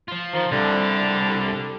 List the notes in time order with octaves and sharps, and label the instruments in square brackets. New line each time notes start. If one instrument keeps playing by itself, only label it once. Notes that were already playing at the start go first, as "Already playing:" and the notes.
[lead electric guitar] F3 F4
[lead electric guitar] D#3 [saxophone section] F3
[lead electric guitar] C2 [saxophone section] D3 F3 G3